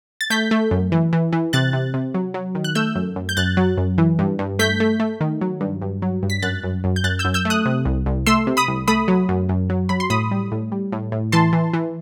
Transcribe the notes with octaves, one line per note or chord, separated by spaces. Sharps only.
A6
A3 G6 B6
A3
F#2
E3
E3
E3
C3 F#6 A6
C3
C3
F#3
F#3
D#3
F#6
A3 E6 G6
F#2
F#2
G6
F#2 F#6 A6
F#3
F#2
E3
G2
G2
A3 G6 B6
A3
A3
D#3
F#3
G2
G2
F#3
G2
B6
F#2 F#6 A6
F#2
F#2
G6
F#2 F#6 A6
E6 G6
F#2
E6 G6
A3
D#6 F#6
C3
C2
C2
A3 C6 E6
C3
B5 D#6
C2
A3 B5 D#6
F#3
F#2
F#2
F#3
F#3 B5
C6
A2 B5 D#6
G3
A2
G3
A2
A2
E3 A5 C6
E3
E3